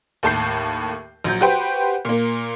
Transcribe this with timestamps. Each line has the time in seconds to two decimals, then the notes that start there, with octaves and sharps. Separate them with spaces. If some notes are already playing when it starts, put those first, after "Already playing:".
0.23 D#2 A2 A5 G6 C7
1.24 A#1 F#3 G6
1.41 F#4 G4 B4 C5 G5
2.05 A#2 A#3